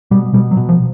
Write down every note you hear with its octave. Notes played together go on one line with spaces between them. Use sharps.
B2 G3
B2 G3
F#3
B2
F3